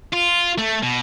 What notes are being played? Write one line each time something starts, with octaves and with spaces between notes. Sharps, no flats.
F4
A3
B2